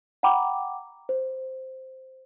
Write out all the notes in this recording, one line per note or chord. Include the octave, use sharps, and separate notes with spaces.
F#5 G5 A#5 B5 D6
C5